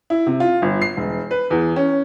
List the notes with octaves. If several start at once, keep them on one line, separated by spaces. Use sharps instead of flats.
E4
C3
F4
G1
C7
E1
B4
E2
C#4